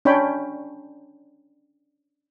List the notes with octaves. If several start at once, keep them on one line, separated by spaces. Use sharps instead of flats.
C#4 D4 C#5 G5 B5